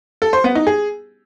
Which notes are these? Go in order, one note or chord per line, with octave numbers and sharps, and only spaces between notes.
A4
C5
B3
D#4
G#4